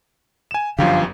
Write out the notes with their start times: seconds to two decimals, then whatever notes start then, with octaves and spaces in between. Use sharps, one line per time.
0.51 G#5 E7
0.79 G1 F#2 D3 F3 G4 F5